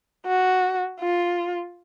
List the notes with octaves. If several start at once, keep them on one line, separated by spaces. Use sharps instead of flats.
F#4
F4